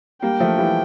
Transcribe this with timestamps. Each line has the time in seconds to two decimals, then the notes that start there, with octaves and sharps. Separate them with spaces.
0.22 G3 A#3 G5
0.40 F3 A3
0.58 E3 G3